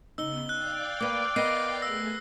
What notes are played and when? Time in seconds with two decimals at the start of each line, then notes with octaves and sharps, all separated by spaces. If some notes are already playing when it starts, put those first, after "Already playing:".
0.18 C#3 B3 D#4 E6 G7
0.49 D5 F5 G5 F#6
1.01 A#3 B4 D6
1.36 B3 A#4 D#5 A#6 C7
1.82 A3 G#4 E6 A#6